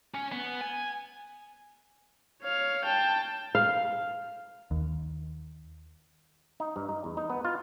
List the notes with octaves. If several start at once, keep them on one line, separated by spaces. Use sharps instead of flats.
C#4
B3
G#5
C#5 F5
G5 A5
F5
D#2
D#4
G2
D#4
E2
D#4
B3
F4